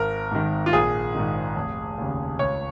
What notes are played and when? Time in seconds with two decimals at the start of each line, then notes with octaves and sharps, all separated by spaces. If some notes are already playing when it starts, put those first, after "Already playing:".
Already playing: G#1 A#4
0.31 G#2 D#3
0.66 F4
0.73 A#1 G#4
1.15 G#2 D#3
1.56 F1
1.98 D#2 C#3
2.39 C#2 C#5